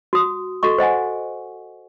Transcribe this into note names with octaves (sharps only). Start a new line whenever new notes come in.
F#4 D#6
F#4 A4 D#5 C#6
C5 D#5 F#5 G#5